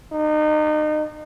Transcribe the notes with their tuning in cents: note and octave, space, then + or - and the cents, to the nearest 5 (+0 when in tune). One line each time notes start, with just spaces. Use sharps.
D#4 -30